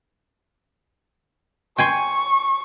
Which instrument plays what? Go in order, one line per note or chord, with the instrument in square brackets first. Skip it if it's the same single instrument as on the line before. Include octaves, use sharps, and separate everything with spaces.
[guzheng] G5 G#5 C6 [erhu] C#6